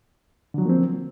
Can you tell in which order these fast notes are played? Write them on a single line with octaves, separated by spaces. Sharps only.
D3 F#3 F3 A#3 C4